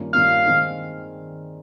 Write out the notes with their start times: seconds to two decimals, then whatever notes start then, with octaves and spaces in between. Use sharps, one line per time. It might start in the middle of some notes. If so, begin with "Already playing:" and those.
Already playing: G2 D#3 A#3 C#4 F4
0.13 G2 D#3 A#3 C#4 F4 F5
0.46 D#3 G#3 C4 D#4 G#4